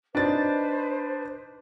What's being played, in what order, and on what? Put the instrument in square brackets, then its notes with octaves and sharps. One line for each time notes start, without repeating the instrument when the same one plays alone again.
[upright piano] D4 D#4 A6 [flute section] B4 C5